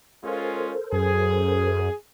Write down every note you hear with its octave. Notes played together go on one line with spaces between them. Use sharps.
G#3 C#4 F4 A4 A#4 C5
F#2 G#4